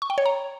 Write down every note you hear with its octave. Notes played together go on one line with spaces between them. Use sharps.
C#6
G5
C#5
A#5